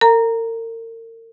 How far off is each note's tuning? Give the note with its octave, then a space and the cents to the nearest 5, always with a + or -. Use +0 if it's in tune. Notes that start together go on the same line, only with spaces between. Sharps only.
A#4 -40 A#5 +0